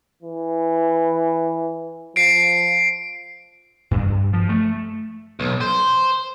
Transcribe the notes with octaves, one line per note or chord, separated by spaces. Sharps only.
E3
F3 C7 D7
G2
F3
A3
B1
C5